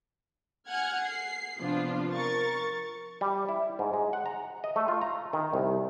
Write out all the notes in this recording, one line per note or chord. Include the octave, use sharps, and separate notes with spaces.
F#5 G#5 F6 F#6 G#6
C7
C3 F3 B3 D4 F4
F3 A#4 C#6 A6
G3
E4
G#2
G#3
F#5
A#5
D#5
A3
F4
A#5
D#3
C2